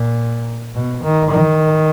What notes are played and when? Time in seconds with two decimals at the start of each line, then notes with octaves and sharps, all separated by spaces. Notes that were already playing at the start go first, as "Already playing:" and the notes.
Already playing: A#2
0.75 B2
1.03 D#3
1.31 D#3